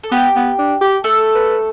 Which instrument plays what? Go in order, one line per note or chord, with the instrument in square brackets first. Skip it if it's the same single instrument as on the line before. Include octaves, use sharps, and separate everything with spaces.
[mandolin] A4
[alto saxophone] B3 [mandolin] G4
[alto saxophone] B3
D4
G4
[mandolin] A3 A4
[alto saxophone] B4